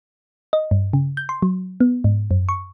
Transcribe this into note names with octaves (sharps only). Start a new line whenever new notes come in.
D#5
G2
C#3
G6
C6
F#3
B3
G#2
F#2
C#6